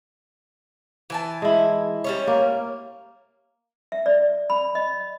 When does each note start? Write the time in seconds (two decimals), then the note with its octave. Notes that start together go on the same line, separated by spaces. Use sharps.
1.10 E3 G#5 A5
1.42 G#3 E4
2.04 G3 C#4 C#5
2.27 A#3
3.92 E5
4.06 D5
4.50 B5
4.75 D#5